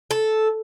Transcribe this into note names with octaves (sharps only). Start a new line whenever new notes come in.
A4